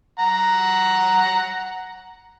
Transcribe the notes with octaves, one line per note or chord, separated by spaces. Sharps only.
F#5 A#5